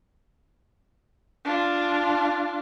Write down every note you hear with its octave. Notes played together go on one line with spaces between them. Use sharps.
D4 F4